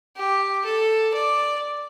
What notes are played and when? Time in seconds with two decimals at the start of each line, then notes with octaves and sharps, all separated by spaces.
0.17 G4
0.65 A4
1.14 D5